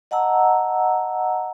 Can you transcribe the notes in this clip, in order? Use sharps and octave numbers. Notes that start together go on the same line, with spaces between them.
D#5 F#5 A5 A#5 E6